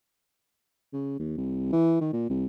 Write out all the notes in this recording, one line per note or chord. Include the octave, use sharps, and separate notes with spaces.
C#3
D#2
C2
E3
D#3
A#2
C2